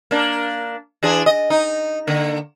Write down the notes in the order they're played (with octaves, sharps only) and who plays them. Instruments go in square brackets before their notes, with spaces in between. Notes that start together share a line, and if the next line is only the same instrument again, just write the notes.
[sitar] A#3 D4
E3 D4 G#4
D#5
D#4
D3 A#3